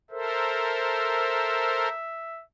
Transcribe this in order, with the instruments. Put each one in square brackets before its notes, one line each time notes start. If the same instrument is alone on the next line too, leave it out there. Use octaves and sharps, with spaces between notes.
[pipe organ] A4 A#4 C5 [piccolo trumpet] E5